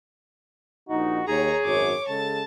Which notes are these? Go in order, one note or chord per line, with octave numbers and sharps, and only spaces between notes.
A#1 D#4 F#4
D#2 G#4 C#5 A#5
G#1 F#2 C#5 D6
C#3 G#3 A4 A5